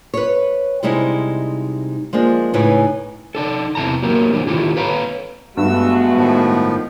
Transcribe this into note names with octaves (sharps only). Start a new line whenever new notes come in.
B4 C#5
C3 G3 G#3 D#4 E4
F3 G#3 A#3 D4
A2 C#3 D#4 E4 B4 G#5
D4 D#4 A4
E2 C3 E3 A5 A#5
F#3 A#3 G4 A#4
E3 D4 G4
D#3 E4 F4 G4 A4
A4 B4 C#5 F5 A#5
G2 G#3 A3 B3 F#4 E6
A2 D#3 F3